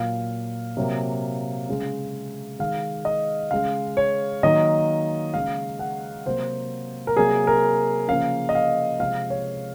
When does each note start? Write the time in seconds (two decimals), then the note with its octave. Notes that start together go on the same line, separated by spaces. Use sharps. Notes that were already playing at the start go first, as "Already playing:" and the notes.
Already playing: A#2 F#3 A#3 F5
0.77 C3 F#3 A#3
1.69 C#3 G#3
2.59 D#3 G#3 F5
3.05 D#5
3.51 C#3 G#3 F5
3.97 C#5
4.43 D#3 F#3 A#3 D#5
5.34 C#3 G#3 F5
5.79 F#5
6.26 C3 F#3 A#3 C5
7.07 A#4
7.17 C3 F#3 A#3 G#4
7.47 A#4
8.08 C#3 F3 A#3 F5
8.49 D#5
8.55 F5
9.00 C3 F3 G#3 F5
9.30 C#5